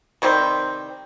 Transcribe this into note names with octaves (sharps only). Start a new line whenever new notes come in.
C3 D#3 G3 C4